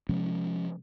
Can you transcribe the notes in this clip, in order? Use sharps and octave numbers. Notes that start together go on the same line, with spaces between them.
C3 F3 G#3 C#4